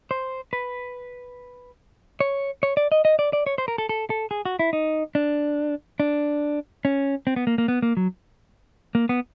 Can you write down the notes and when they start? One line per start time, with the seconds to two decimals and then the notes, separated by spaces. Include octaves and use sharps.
0.11 C5
0.53 B4
2.20 C#5
2.63 C#5
2.77 D5
2.92 D#5
3.05 D#5
3.19 D5
3.33 D5
3.46 C#5
3.58 C5
3.68 A#4
3.78 A4
3.89 A4
4.10 A4
4.31 G#4
4.45 F#4
4.59 E4
4.73 D#4
5.15 D4
6.00 D4
6.85 C#4
7.27 C4
7.36 B3
7.47 A#3
7.58 A#3
7.68 B3
7.82 A#3
7.97 F#3
8.95 A#3
9.09 B3